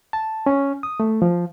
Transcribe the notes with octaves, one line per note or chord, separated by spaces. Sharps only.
A5
C#4
D#6
A3
F3